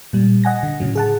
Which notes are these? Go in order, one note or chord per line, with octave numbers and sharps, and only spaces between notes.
A#2 G3
D#5 F#5 G#5 A#6
D3
A2 C#3 F#3
G#4 F#5 A5